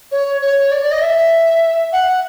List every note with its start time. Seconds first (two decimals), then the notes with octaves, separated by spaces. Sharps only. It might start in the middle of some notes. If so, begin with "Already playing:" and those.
0.11 C#5
0.41 C#5
0.71 D5
0.82 D5
0.91 D#5
1.01 E5
1.92 F#5